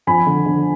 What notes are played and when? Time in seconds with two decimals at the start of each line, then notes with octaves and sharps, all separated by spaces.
0.07 F2 G#5 B5
0.27 D3
0.46 D3